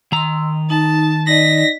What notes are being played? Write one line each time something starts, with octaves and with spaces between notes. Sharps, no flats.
D#3 A#5 C6 E6
D#4 A5
D#4 D5 D#5 A#6 B6